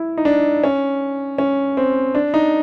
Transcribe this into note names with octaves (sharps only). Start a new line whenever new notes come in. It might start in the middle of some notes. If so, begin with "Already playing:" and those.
Already playing: E4
D#4
D4
C#4
C#4
C4
D4
D#4